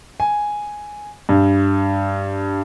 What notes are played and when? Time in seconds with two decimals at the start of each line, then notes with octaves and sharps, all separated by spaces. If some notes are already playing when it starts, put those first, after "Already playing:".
0.20 G#5
1.29 G2